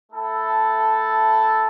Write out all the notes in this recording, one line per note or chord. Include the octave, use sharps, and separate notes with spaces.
A3 E4 A4